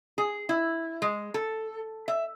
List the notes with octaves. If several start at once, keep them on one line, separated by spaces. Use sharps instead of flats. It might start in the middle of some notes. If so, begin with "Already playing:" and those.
G#4
E4
G#3
A4
E5